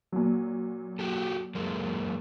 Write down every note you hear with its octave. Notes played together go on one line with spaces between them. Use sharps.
A#2 F#3
F#4 G4 A4
F#2 G#3 A#3